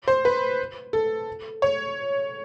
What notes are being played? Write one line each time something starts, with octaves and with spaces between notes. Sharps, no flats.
C5
B4
A4
C#5